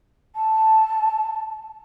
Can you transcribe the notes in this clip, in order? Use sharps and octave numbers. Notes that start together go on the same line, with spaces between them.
A5